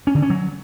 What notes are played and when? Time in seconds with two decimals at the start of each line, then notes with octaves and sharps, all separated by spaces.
0.07 C#4
0.15 D3
0.22 C#4
0.30 F#3